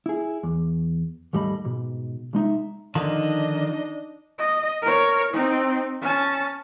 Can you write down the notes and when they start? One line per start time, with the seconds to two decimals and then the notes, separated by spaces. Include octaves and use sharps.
0.06 E4 G#4
0.43 E2
1.33 D#2 G#2 G3 A3 D#5 B5
1.65 G#2 B2
2.33 C2 G#3 D#4 E5
2.95 D3 D#3 F3 D4 D#4 D#5
4.38 D#5
4.82 A#4 C#5
5.33 C4 D#4
6.01 C#4 A5